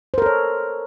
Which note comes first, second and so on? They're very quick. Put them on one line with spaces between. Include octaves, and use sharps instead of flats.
C5 A#4 A4 C#5